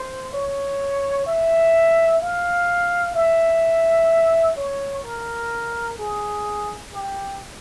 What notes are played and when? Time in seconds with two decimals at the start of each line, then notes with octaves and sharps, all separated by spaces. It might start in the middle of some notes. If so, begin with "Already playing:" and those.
Already playing: C5
0.33 C#5
1.26 E5
2.21 F5
3.14 E5
4.56 C#5
5.03 A#4
5.98 G#4
6.92 G4